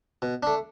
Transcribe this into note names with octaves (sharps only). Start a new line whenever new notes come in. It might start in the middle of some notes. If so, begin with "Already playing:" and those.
B2
A3 D4